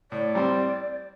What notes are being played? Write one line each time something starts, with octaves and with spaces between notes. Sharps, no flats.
A2 D5
G3 C4